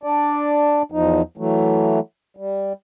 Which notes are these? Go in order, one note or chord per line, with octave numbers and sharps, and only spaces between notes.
D4 D5
E2 F3 D#4
E3 F#3 A3
G3